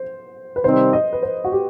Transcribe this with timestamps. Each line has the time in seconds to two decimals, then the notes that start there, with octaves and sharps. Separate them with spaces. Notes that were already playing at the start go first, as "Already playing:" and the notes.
Already playing: C5
0.56 B4
0.64 C3 D#3 G3 C4 D#4 C5
0.93 D#5
1.13 B4
1.23 C5
1.44 F#4
1.52 G4